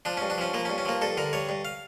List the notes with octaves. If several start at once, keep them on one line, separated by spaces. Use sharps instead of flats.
F3 D4
G2 C#4
D4
F3 C#4
F3 A#3
C#4
G2
C#4
F3 A#3
G2 A4
D3 A#4
G2 C#5
G2
F5